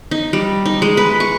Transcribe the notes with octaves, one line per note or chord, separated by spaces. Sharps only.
D#4
G3
D#4
G#3
B4
C#6